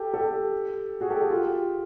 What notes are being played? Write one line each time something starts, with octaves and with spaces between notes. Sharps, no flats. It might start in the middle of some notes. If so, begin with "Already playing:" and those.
Already playing: G4 A4
G4 A4
F#4 G#4
G4 A4
F#4 G#4
F4 G4